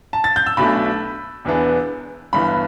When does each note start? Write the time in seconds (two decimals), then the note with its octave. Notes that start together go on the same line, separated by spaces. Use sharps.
0.13 A5
0.24 A6
0.36 G6
0.46 E6
0.57 B1 B2 A3 D4 B5
1.45 E1 E2 E3 B3 D4
2.33 G1 G2 E3 B3 B5